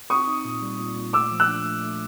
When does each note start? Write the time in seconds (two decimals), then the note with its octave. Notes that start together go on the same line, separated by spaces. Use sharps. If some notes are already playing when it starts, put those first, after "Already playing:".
0.10 C4 C#6 D#6
0.28 D#4
0.45 A#2
0.62 G3
0.79 A#2
0.97 A#2
1.13 A3 D6 E6
1.32 F3
1.40 E6 F#6
1.48 D4
1.65 A3
1.83 A3